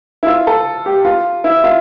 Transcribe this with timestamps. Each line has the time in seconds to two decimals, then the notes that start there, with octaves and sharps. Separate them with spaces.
0.23 E4
0.27 F4
0.47 A4
0.86 G4
1.05 F4
1.44 E4
1.64 F4